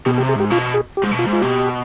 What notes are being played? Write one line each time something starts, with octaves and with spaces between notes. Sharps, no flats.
B2 G4
G4
C3
G#4
G#2 G4
B2 F4
G#4
G4
G#2
B2
F4
G#2
F4
B2 G4